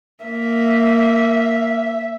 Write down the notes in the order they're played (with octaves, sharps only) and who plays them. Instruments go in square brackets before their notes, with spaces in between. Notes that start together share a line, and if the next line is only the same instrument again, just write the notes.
[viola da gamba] A#3 [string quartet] E5